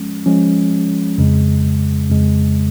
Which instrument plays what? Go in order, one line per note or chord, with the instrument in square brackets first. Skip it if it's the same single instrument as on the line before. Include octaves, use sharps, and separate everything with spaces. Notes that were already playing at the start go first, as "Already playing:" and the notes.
Already playing: [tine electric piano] F3 G#3 C#4
F3 G#3 C#4
F2 C#3 G#3
F2 C#3 G#3